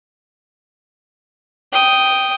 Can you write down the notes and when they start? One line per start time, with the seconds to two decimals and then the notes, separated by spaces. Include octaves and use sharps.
1.73 G5 D#6